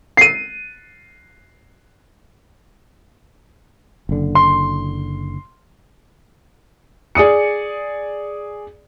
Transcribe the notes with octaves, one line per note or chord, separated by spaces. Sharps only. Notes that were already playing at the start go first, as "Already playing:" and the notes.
C7 D#7
F#1 D3
C6
G#4 D5 D#6 C#7